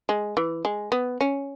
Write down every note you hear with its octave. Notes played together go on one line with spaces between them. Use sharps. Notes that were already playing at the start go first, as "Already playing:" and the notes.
G#3
E3
G#3
B3
C#4